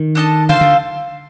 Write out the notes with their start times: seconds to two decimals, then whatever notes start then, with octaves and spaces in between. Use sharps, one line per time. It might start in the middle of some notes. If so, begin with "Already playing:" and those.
Already playing: D#3
0.15 D4 A4 D#5 A5
0.49 D3 F4 A4 C5 F5
0.61 D3